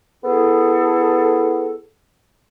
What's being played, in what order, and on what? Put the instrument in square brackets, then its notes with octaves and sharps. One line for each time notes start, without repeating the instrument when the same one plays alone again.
[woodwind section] B3 E4 G#4 A4